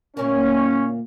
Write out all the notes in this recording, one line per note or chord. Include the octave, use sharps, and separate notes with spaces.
D2 A#2 A#3 C#4